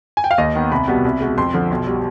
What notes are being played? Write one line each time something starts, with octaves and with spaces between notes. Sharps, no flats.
G#5
G5
F5
D#2 D#5
D#3 B3
C2 B5
B2 G3 B3
C2
B2 G#3
F2 C6
D3 F3
B1
B2 G3